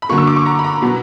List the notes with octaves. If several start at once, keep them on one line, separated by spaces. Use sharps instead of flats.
B5
D3 F#3 A#3 C#6
E6
D6
C#6
A#5
B5
A#5
B2 F#3 B3